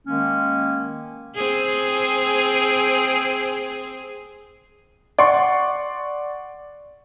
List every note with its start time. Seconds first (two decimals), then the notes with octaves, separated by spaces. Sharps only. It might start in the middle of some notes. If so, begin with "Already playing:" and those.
0.06 D#3 G#3 A#3 C#4
1.35 C4 G#4
5.19 D5 F#5 C6 C#6